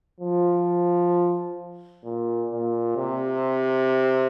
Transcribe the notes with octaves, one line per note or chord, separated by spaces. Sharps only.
F3
A#2
A#2
C3